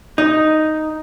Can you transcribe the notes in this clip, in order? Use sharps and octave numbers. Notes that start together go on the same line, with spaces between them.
D#4